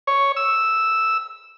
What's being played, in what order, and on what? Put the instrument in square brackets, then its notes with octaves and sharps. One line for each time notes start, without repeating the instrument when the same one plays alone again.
[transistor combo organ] C#5
E6